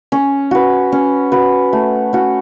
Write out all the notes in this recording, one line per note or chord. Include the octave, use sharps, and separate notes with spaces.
C#4
F#4 B4
C#4
F#4 B4
A3
C#4 F#4